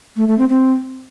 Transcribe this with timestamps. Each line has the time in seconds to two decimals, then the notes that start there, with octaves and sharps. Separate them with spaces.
0.17 A3
0.27 A3
0.38 C4
0.49 C4